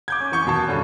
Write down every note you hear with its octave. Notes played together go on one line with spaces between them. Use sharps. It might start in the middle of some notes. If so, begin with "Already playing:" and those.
D6 G6 G#6
C#4
E3 C#6 G6
D#2 B2 A5
G2 D3 C#4